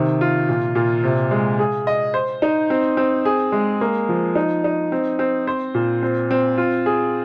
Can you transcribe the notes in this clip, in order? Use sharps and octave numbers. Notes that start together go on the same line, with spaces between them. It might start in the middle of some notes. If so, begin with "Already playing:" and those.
Already playing: C3 D#3
F4
A#2
A#2
C3
G#3
G#4
D#5
C5
D#4
C4
C4
G#4
G#3
A#3
F3
D#4
D#4
C4
C4
C5
A#2
C4
C4
F4
G#4